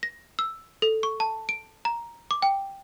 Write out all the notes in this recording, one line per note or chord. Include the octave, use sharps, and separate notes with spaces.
A#6
E6
A4
C#6
A5
D7
A#5
D6
G5